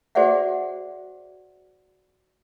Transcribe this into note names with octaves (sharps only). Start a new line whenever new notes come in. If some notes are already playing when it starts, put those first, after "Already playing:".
F#4 G#4 C5 D5 E5 F#5